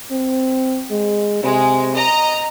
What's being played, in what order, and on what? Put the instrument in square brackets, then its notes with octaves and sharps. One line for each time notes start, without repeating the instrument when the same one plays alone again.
[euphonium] C4
G#3
[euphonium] C3 [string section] G#3
[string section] D#5 A#5